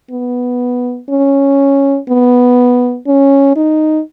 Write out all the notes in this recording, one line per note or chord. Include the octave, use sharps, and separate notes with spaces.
B3
C#4
B3
C#4
D#4